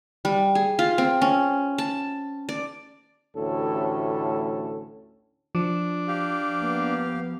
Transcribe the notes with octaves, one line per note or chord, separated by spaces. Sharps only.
G3
G#4
F4
C4
C#4
A5
D5
A1 D2 A2 C#4 A4
F3 D4
G4 F5
A#3 B3